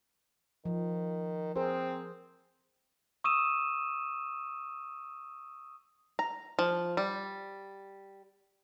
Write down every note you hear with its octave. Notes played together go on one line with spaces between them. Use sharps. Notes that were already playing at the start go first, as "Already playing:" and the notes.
D#3 F3
C4 G#4 A#4 C5
C#6 D#6 E6 D#7 E7
A#5
F3
G3